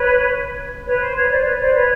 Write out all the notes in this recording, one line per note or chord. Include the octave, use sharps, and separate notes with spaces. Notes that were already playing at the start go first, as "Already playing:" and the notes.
Already playing: B4 C#5
B4 C#5
C5
B4 C#5
C5 D5
B4 C#5
C5 D5
B4 C#5